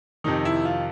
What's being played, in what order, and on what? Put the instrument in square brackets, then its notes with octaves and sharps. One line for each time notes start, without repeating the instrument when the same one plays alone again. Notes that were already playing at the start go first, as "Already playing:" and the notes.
[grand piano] F2 C3 D#3 D#4
E4
F4